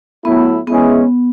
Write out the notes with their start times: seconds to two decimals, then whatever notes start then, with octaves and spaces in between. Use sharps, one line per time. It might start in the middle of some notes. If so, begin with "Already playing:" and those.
0.25 A2 F#3 A3 B3 E4
0.67 E3 G#3 B3 C#4 E4 G#4